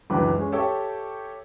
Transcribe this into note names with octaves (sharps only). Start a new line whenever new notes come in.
C#2 F#2 E3 D4 B4 D6
G#3 C#4
G4 A4 C#5 E5 G5